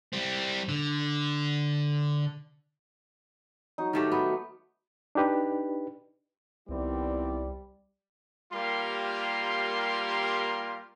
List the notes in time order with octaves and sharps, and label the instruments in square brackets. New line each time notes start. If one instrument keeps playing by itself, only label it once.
[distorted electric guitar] G3 C4
D3
[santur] F#3 D#4
[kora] D#3 A3 G4
B3
[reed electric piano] D4 D#4 G4 B4
[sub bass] C2 [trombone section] D#3 B3 C4 [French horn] G3 [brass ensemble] E4 D5
[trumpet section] G3 A#3 F4 G4 A#4 C6